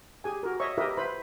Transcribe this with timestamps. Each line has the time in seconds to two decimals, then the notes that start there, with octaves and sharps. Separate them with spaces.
0.24 G4 G#4 G#5
0.43 F#4 A#4
0.60 C#5 D#5 E5 C#6
0.78 E4 G4 A#4 B4 D#5 E5
0.97 E4 B4 C5 B5